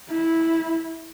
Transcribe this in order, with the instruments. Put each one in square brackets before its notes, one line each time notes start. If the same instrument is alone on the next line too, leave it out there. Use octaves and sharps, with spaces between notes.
[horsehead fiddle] E4